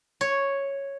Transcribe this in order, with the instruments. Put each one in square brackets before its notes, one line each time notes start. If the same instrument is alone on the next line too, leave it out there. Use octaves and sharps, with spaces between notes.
[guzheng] C#5